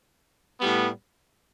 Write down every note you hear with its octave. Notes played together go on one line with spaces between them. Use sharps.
A2 G3 B3